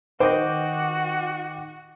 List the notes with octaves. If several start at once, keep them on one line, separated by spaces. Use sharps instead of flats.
D#3 F#4 C5 D#5 G5 D6